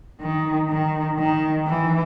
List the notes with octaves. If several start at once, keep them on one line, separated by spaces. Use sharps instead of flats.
D#3
D#3
D#3
E3